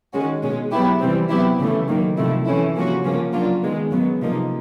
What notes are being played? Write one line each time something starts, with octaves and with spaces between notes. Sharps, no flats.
D#3 G#3 C#4 F#4
B2 G#3 C#4
F#3 B3 E4 G4
C3 E3 G3 C4
F#3 B3 E4 G4
C#3 E3 A3
D#3 F#3 A#3
C3 F3 A3 C4 E4
E3 A3 C#4 E4
C3 F3 A#3 C#4 F#4
C#3 F3 A#3 C#4
F#3 A#3 D4 F4
D#3 G#3 B3
C#3 F#3 B3
C3 F3 A#3 D#4